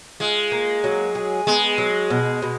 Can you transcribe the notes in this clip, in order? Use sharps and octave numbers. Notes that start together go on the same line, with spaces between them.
G#3 F4
A#3
F#3
G#4
G#3 B3
F#3
B2
B2